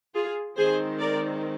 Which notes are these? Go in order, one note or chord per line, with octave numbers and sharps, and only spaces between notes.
F4 G#4
D#3 G#3 C4 G#4 C5
A#4 D5